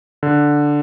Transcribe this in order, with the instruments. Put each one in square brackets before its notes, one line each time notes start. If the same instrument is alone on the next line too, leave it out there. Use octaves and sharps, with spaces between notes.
[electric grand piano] D3